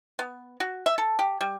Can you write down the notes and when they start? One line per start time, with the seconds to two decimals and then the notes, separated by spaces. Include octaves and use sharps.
0.19 B3
0.60 F#4
0.86 E5
0.98 A4
1.19 G4
1.41 G3